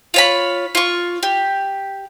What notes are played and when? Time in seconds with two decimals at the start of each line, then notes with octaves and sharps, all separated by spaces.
0.14 F4 C#5 B5
0.75 F4 C#6
1.23 G4